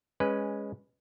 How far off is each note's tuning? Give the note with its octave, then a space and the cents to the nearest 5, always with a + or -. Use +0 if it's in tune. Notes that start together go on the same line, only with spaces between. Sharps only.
G#3 -10 C#4 -5 B4 +0